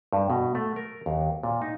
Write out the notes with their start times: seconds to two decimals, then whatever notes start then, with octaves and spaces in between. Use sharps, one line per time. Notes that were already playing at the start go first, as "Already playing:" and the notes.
0.13 G2
0.30 B2
0.55 A3
0.76 A#4
1.06 D#2
1.43 A#2
1.62 D#4